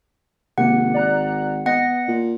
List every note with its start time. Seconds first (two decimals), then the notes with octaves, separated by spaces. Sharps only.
0.58 G#1 C3 A#3 F#5
0.94 D5 A#5 F#6
1.66 B3 D#5 F#5 A#6
2.08 A#2